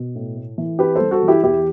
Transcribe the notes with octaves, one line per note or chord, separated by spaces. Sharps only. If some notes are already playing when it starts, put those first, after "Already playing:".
Already playing: B2
A2
A3
E3
C4 G4 B4
A4 C5
G3
F#4 A4
E3
E4 G4
E2 E4 G4